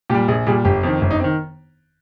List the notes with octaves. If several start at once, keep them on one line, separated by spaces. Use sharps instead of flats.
A#2 G3 G4
A#1 G#4
A#2 G3 G#4
G1 G4
F2 D#3
G1
D#4
C4
D#3